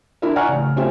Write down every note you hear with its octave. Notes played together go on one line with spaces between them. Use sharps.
D4 E4 A#4 E5
D5 F#5 G#5 A#5 C#6 F6
A1 C#3
A3 C4 C#4 F4 G4 E5